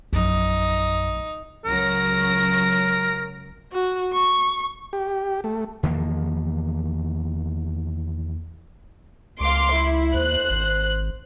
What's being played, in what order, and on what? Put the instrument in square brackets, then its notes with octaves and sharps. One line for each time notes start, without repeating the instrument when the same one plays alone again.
[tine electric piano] A#1 [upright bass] F#2 [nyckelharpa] D#4
[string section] C#2 F#3 A#6 [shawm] A#4
[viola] F#4
C#6
[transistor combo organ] G4
A3
[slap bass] E2 D#3 F3 A#3
[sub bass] C#2 [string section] F5 C6 D6
[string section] E4
[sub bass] D#2 [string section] C5 F#6
[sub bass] G#1